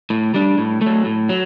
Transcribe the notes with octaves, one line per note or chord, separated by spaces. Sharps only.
A2
G3 D4
A2
F#3 A3
A2
F#3